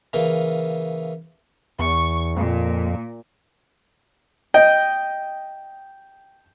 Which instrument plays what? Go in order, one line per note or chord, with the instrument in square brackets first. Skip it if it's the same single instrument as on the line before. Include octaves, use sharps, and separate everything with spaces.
[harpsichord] C#3 E3 A#3
[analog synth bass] E2 [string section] C#6
[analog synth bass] F2 [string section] A#2
[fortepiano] D#5 [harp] G5